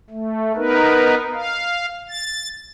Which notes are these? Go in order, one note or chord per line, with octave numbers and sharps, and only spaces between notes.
A3
B3 D#4 A#4 B4
F5
A6